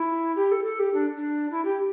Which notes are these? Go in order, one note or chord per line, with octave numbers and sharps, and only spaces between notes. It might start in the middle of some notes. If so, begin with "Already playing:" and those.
Already playing: E4
G4
A4
A4
G4
D4
D4
E4
G4